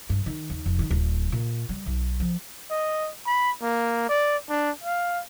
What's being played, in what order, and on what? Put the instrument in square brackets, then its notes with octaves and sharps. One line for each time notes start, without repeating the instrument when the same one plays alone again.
[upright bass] G2
D#3
D#2
F1
D#3
D1
A#2
G3
B1
F3
[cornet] D#5
B5
A#3
D5
D4
F5